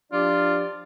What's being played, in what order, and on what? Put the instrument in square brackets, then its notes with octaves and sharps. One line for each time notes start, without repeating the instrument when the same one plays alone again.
[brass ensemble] F3 D4 [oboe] F4 [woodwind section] G4 D5